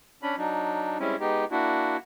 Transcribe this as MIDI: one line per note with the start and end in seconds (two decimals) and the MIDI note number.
0.23 0.36 61
0.23 0.36 62
0.23 0.36 83
0.38 0.98 54
0.38 0.98 62
0.38 0.98 63
1.00 1.16 55
1.00 1.16 56
1.00 1.16 60
1.00 1.16 61
1.00 1.16 64
1.20 1.45 56
1.20 1.45 59
1.20 1.45 63
1.20 1.45 67
1.51 1.97 58
1.51 1.97 62
1.51 1.97 64
1.51 1.97 66